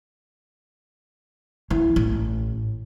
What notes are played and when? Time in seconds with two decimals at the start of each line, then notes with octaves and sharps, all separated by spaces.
1.70 E3 B3
1.96 A1